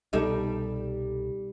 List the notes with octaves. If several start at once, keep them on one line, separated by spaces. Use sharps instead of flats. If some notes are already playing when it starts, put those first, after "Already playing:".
C2 B2 G3 D#4 A4